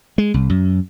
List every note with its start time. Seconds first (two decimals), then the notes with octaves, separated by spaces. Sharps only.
0.18 G#3
0.34 C2
0.50 F#2